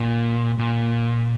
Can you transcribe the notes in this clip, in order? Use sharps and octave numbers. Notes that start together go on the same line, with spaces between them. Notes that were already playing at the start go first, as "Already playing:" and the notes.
Already playing: A#2
A#2